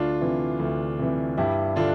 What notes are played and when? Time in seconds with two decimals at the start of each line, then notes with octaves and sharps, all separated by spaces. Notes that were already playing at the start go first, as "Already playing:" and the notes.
Already playing: D2 D4 F4
0.21 C3 E3
0.59 D2
0.99 C3 E3
1.37 G2 E4 G4
1.76 D3 D4 F4